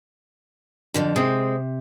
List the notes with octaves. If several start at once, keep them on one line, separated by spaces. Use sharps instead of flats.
F2 D3 F3
C3 G#3 C4